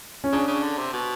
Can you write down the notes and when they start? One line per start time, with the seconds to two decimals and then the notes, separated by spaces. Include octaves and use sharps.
0.24 C#4
0.32 C#3 D4
0.48 C#3
0.63 D3
0.78 C3
0.93 B2